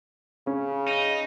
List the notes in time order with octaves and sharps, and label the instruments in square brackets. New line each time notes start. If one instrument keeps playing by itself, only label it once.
[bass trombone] C#3 [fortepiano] C#4
[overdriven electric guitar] D#4